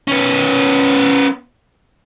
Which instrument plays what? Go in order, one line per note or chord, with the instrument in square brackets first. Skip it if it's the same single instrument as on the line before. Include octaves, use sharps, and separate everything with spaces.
[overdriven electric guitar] B3 C#4